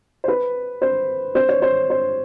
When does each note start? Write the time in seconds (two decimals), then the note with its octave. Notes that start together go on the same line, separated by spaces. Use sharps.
0.24 C5
0.28 B4
0.82 C5
1.35 C5
1.49 C#5
1.62 C5
1.90 C5